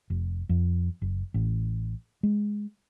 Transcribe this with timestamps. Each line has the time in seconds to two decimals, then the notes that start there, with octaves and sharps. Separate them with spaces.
0.10 F1
0.49 F2
1.02 F#1
1.34 A1
2.23 G#3